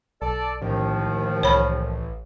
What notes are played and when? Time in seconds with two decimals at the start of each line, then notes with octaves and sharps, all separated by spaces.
0.22 B1 A4 D5
0.62 A1 D#2 D#3 F3
1.43 C2 C#5 B5